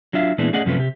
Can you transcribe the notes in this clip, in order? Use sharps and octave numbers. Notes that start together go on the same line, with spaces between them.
F#3 D4 F4 E5 F5
A#2 E3 G#3 B3 D4
A3 C#4 G#4 D5 D#5 F#5
F#2 C3 F3 A3 C#4 B4
C3 G4